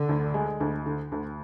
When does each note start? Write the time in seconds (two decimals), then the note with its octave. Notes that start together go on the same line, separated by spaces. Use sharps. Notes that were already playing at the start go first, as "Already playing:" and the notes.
Already playing: D3
0.09 D2
0.34 G#3
0.60 D2
0.86 D3
1.12 D2